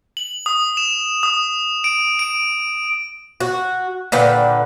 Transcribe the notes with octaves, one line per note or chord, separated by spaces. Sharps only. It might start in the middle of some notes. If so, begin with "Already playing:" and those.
F#7
D#6
E7
D#6
D7
D7
F#4
A#2 D3 B4 G5